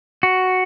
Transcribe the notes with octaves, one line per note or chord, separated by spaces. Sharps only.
F#4